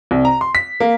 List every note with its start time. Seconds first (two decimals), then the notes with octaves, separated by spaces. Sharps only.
0.11 C2
0.25 A#5
0.41 C6
0.55 B6
0.80 A#3